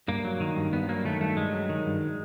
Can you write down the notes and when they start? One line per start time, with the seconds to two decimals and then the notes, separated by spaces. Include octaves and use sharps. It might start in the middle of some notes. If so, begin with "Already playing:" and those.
0.08 G2 A#3
0.25 F#3
0.40 D#3
0.56 G2
0.73 G2 B3
0.89 F#3 A#3
1.05 D#3 A3
1.21 G2 A3
1.37 G2 G#3
1.53 F#3
1.69 D#3
1.86 G2